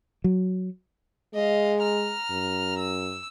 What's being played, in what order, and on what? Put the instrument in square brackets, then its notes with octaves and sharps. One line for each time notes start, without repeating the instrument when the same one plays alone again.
[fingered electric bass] F#3
[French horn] G#3 [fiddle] D#5 F5
[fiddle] A#5 F6
[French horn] F#2
[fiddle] E6